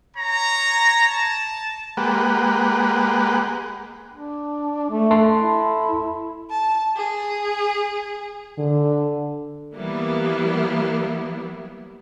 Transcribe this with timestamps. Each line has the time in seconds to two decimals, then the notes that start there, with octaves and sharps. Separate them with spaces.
0.17 C#5 A#5
1.08 A5
1.97 G#3 A#3 G4 B4 F#5
4.13 D4
4.90 A3
5.11 A4 A5 C6
5.40 E4
6.50 A5
6.97 G#4
8.58 D3
9.76 E3 F#3 G3 A#3 B3 E4